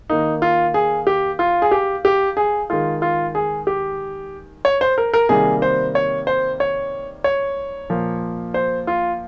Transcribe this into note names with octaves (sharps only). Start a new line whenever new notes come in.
D#3 A#3 D#4
F4
G#4
G4
F4
G#4
G4
G4
G#4
D#3 G#3 F4
F4
G#4
G4
C#5
C5
A#4
A#4
C3 D#3 G3 A#3 G#4
C5
C#5
C5
C#5
C#5
A#2 F3 A#3
C5
F4